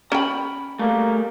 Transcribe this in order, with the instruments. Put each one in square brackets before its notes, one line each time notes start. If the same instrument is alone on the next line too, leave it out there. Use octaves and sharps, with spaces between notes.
[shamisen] C#4 G5 [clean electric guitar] A#5 B5
[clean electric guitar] G3 A3 [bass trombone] A#3